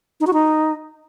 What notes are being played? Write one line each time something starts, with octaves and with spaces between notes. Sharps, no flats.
D#4
F#4
D#4